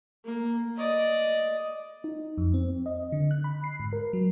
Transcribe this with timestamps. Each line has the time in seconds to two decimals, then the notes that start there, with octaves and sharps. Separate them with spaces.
0.25 A#3
0.77 D5 D#5
2.04 D#4
2.38 F2
2.54 C4
2.86 D#5
3.12 D3
3.31 F#6
3.44 B5
3.64 C7
3.80 G#2
3.93 A#4
4.13 F#3